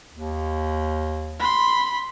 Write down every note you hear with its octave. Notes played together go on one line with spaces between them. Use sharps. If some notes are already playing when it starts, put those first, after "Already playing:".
D#2
B5 C6